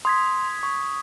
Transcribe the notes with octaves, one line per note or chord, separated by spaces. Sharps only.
C6 D#6 G#6 B6
C#6